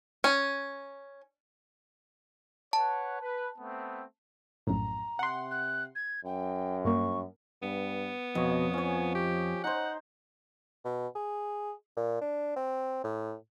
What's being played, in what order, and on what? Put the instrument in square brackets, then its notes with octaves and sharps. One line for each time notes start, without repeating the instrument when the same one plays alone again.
[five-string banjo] C#4
[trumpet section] B4 C#5 F#5 [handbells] A5
[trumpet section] B4
A3 B3 C4
[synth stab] A#1 F#2 A2 [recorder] A#5
[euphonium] C3 [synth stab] F#5 C6
[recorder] F#6
G#6
[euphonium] F#2 [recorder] G5
[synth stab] G2 A#3 [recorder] C#6
[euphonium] G2 [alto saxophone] B3
[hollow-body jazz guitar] F2 [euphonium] B2 [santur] C#5 D#5
[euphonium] F3 [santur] C#4 C#5
[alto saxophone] G4
[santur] D#4 C5 [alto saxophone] F#5
[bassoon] B2
G#4
A#2
D4
C4
A2